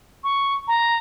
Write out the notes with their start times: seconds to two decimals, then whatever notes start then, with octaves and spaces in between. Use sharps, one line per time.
0.24 C#6
0.68 A#5